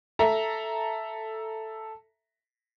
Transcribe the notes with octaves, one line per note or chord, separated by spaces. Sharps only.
A4 E5 A#5